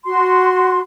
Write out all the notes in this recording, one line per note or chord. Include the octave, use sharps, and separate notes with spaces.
F#4 C6